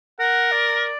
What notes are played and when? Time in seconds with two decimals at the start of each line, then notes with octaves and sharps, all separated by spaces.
0.19 A#4 F#5
0.52 D5